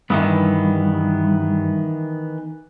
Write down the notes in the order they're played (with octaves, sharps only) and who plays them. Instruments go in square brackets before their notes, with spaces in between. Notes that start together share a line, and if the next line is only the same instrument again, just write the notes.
[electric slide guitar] G2 [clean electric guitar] D#3 E3 B3